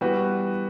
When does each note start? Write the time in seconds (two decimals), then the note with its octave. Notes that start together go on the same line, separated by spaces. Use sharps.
0.01 E3 G3 B3 F#4 B4